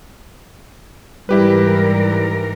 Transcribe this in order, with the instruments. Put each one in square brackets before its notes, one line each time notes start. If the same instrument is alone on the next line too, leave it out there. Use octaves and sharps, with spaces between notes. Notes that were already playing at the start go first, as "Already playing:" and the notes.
[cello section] G#2 E3 A#4 [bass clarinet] G3 [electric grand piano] E4 G4 B4